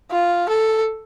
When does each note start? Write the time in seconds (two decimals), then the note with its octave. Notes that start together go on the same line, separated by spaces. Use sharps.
0.11 F4
0.48 A4